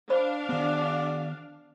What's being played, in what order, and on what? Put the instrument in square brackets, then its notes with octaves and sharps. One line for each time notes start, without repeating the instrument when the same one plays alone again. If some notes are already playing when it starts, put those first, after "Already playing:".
[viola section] D4 F5 [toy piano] C5 B5
[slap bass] D#3 B3 [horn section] F#4 G#4 D5